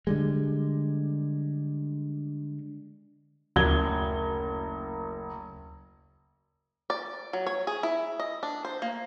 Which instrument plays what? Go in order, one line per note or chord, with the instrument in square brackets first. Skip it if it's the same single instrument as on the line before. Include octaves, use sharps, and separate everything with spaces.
[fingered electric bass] D3 G3 G#3
[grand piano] F#1 G#6 G7 [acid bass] D2
[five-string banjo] D5
F#3
C#5
G#4
E4
D#5
D4
C5
A#3